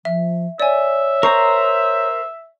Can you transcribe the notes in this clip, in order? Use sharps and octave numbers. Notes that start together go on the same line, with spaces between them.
F3 E5
C#5 D5 E5 G#5
A#4 C5 A#5 C#6